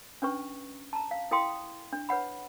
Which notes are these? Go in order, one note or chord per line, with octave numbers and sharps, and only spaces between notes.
C#4 D4 B4 C#6
A5 A#5
F5
E4 A4 F5 G5 C6 D#6
D4
B4 C#5 F#5 B5